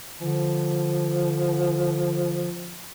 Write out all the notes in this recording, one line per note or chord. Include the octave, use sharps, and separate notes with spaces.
D3 F3